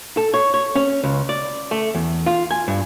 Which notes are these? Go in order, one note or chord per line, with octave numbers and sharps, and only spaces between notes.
A4
C#5
C#5
C#4
C#2
D5
A3
E2
F4
G#5
G2